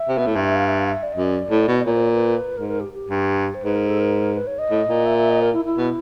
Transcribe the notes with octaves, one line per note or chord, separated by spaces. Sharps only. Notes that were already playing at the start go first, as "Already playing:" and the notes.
Already playing: E5
C3
B2
A2
G2
E5
F5
E5
F5
E5
D5
F#2 D#5
D5
A2
B2
D5
A#2 C#5
C5
C#5
B4
G#2 A#4
A#4
G4
G4
G2
C5
G#2 B4
A#4
A4
A#4
B4
C#5
D#5
A2
A#2
E5
E5
D#5
A#4
E4
E4
B2